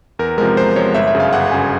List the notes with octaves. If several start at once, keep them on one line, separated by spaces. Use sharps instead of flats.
E2 A#4
C3 F3 G#3 A#4
E2 C5
C3 F3 G#3 C#5
G1 E5
E5
F#2 C#3
F5
G1 F#5
F#2 C#3 G#5